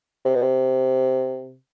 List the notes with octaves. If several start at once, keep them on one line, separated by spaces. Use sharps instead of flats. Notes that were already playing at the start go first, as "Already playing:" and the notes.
C3
B2
C3